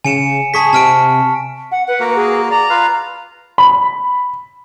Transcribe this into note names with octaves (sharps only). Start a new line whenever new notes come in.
C#3 G#5 C#7 E7
G#4 A5 C#6 B6
C3 A5 F6 D7
F#5
B4 F#5
A#3 F#4 A#4
G#4
D5 A#5
F4 B4 F5
B5